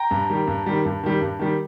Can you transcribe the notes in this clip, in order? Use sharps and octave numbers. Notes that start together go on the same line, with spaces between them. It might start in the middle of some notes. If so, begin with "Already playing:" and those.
Already playing: G5 A#5
G2
D#3 G3
G2
D#3 G3
G2
D#3 G3
G2
D#3 G3